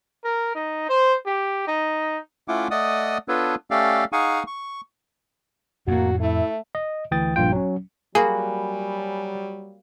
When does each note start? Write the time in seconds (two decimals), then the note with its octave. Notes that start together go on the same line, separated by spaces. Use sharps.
0.24 A#4
0.55 D#4
0.89 C5
1.26 G4
1.68 D#4
2.48 A3 C#4 E4 F4 F#5 D6
2.71 A3 D5 D#5 F#5 D#6
3.28 B3 D4 F4 A4 B4 C#5
3.71 A3 C#4 G4 A4 D5 F5
4.13 D#4 G#4 F5 F#5 G#5 C#6
4.47 C#6
5.88 F2 A2 A#3 F#4
6.20 A3 E4
6.75 D#5
7.11 D2 E3 G5 D#6 A6
7.36 A#1 G2 A#2 F4 G5
7.52 F#3 C#4
8.15 F#3 G3 A#3 F#4 G#4 G#5 B5